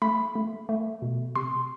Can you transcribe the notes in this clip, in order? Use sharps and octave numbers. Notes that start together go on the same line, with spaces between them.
A3 B5
A3
A3
B2
C3 C6